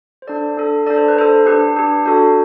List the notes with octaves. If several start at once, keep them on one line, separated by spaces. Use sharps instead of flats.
C5
D4 A4 D5
D4 A4
D4 A4 D5
C5
B4
D4 A4 C5
D4 G4 B4
D4 G4
D4 F#4 A4